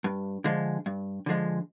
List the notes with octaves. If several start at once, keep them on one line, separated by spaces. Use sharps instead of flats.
G2
D3 F3 G#3
G2
D3 F3 G#3